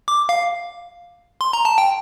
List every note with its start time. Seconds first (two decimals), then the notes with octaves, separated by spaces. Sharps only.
0.08 D6
0.29 F5
1.41 C6
1.53 A#5
1.65 A5
1.78 G5